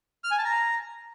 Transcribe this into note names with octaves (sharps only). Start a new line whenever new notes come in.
F6
G#5
A5
A#5